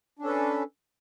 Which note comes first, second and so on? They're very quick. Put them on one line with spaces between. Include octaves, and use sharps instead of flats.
D4 C#4 A4 B4